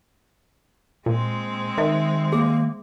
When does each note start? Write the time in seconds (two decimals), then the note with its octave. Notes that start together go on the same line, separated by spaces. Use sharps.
1.06 A#2 G#3 C4
1.78 D#3 E5
2.32 A#3 G#4